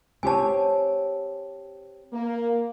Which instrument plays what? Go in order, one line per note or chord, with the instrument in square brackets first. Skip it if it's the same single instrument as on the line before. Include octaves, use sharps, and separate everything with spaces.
[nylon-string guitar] C4 G4 C#5 [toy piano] G#5 A5
[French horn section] A#3